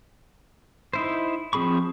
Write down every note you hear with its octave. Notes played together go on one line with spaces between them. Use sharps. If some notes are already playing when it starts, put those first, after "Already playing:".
D#4 E4 C5
F3 C4 G#4 B5 C#6